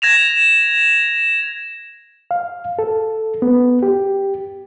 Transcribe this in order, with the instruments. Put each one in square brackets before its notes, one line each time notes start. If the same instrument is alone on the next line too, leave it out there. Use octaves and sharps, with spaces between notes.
[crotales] G#6 A#6 E7 F7
[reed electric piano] F5
A4
B3
G4